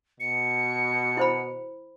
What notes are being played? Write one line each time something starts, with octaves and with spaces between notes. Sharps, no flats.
B2 C#7
E4 C5 B5